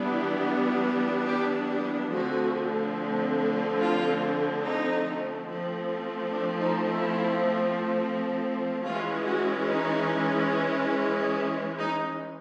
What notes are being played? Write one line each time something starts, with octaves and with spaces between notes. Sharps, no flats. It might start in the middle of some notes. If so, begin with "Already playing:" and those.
Already playing: E3 G3 B3 D4
G4
G4
D3 F3 A3 C4 F#4
F4
D#4
F3 A3 C4
D4
D#4
E4
E3 G#3 C#4 F4
F#4
D#4
D#4